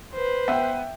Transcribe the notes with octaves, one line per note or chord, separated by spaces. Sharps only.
B4 C5
B3 E5 G5